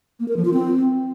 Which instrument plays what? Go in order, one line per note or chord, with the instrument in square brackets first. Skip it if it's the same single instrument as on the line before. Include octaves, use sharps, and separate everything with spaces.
[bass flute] A#3
A#4
F3
F4
C4